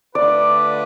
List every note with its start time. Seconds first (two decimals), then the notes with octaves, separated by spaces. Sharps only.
0.14 D3 A3 D4 F4 B4 D5